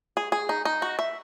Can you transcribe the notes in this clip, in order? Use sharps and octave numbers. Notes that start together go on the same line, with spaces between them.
G#4
G#4
D#4
D#4
F#4
E5